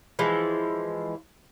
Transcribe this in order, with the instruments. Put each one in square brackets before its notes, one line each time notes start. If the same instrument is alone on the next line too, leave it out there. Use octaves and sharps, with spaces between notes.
[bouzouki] E3 F3 G#3